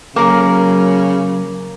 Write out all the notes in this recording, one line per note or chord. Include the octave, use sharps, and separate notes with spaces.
C#3 F#3 A#3 A#4